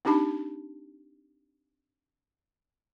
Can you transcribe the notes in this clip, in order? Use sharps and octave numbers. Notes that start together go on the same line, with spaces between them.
C4 D4 D#4 G4 A5 B5